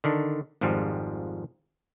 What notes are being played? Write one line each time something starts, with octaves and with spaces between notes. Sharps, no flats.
D3 D#3 D4
G#1 F2 G#2 F3 G3